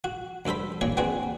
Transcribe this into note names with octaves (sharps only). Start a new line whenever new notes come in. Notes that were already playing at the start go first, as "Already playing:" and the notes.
F#4
D2 G2 A4 C5 B5
D#2 A#2 A#3 C#4 C#5 C#6
B3 C4 D4 F#4 G#4